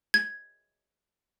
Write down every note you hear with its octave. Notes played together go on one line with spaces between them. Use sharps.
G#6